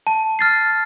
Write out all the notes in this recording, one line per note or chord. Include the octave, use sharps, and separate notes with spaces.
A5
F6 A6 C7